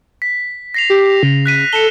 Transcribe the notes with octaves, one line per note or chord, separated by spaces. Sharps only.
B6
A#6 C7 F7
G4
C#3
F#6 B6 D#7
A4 C#7 E7 G7